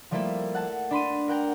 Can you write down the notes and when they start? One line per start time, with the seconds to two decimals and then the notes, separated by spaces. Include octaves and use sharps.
0.11 F3 G3 A3 A#3 E4 A4
0.55 F#5 A5
0.91 D4 B5 C6 D#7
1.28 A#4 F#5 G5 A#5